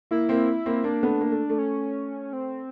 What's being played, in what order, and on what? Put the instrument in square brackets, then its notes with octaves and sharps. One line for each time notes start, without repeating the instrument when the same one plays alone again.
[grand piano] A#3 [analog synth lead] E4
[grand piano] A#3 C4
A#3 C4
[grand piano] A#3 [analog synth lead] D4
[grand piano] A3 B3
A#3
A3
A3
[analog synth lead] C#4
C4